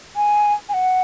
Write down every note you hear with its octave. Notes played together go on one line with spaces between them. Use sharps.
G#5
G#5
F#5